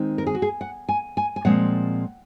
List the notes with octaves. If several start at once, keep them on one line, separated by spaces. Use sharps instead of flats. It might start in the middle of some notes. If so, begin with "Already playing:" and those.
Already playing: D#3 G#3 C4 D#4
A#4
G#4
F#4
G#4
F#5
G#5
G#5
G#5
A#2 F3 G#3 C4 F#5